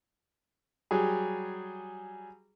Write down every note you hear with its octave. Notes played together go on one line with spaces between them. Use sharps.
F#3 G3 G#4